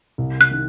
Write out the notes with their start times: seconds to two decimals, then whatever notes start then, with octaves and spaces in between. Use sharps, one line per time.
0.18 C2
0.41 F#6
0.51 C3 D#3